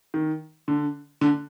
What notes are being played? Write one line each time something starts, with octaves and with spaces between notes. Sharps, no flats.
D#3
D3
D3